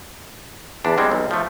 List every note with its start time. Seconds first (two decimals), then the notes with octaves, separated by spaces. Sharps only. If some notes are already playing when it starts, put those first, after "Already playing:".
0.85 E2 D4
0.98 G3 G#3 C4
1.12 B1
1.31 F3 A3